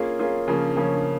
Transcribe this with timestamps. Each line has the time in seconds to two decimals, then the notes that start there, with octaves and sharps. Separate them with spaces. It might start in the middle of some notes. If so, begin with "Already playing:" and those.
Already playing: A#3 C#4 F4 G#4
0.19 A#3 C#4 F4 G#4
0.48 C#3 F3 A#3 C#4
0.77 C#3 F3 A#3 C#4